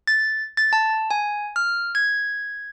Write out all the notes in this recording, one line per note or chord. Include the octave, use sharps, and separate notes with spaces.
A6
A6
A5
G#5
F6
G#6